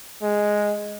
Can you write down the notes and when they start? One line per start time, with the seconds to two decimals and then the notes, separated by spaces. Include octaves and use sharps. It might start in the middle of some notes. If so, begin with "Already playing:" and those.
0.23 G#3